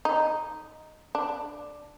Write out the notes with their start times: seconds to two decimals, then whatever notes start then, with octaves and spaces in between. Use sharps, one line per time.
0.05 D#4
1.15 D4